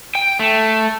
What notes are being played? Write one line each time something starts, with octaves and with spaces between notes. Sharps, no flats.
G5
A3